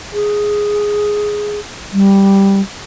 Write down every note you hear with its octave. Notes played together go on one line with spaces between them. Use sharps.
G#4
G3